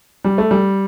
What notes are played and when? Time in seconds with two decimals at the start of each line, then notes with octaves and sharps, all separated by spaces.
0.24 G3
0.38 A3
0.51 G3